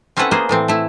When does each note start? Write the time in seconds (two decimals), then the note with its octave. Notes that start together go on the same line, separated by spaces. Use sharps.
0.17 C4 C#4 E4 A4 B4 F#5
0.31 A#3 B3 G#4 C5
0.49 A2 E3 C4
0.68 A3 E4